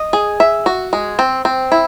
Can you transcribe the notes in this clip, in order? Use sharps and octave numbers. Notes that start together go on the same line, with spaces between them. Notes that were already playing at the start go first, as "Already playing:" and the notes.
Already playing: D#5
G#4
E5
F#4
G#3
C4
C4
E4